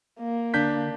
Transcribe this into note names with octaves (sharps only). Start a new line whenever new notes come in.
A#3
D3 D4 G6 B6